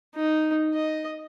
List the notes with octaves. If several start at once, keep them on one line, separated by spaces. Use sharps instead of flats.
D#4
D#5